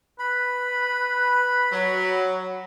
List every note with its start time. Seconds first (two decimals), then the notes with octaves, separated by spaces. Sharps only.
0.19 B4 B5
1.72 F#3